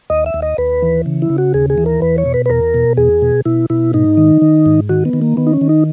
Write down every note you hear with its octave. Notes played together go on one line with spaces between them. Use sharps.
D#2 D#5
E5
D#2
D#5
D#2 B4
E3
C#3
E4
C#3
F#4
D#2 G#4
G#4
E3
A#4
E2 B4
C#5
B2
B4
B4
E2 A#4
B2
E2 G#4
B2
B2 E4
B2 E4
G#2 D#4
D#3
D#3
G#2
D#3 F#4
B3
D#3
A#3
D#3 B3
D#4
C#4
D#3
D#4